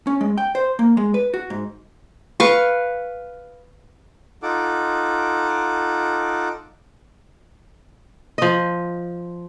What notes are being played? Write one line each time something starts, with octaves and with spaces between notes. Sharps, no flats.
C#4
G#3
G5
C5
A#3
G#3
B4
F#4
G#2
B4 F5 C#6
D#4 F4 A4 F#5 D6
F3 D#5